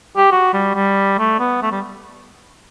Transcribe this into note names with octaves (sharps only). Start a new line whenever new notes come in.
G4
F#4
G3
G3
A3
B3
A3
G3